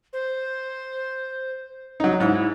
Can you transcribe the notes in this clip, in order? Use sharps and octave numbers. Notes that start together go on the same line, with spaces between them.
C5
F#3 D#4
G#2 E4